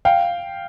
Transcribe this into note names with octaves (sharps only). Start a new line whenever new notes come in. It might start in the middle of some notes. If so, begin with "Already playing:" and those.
F5 G5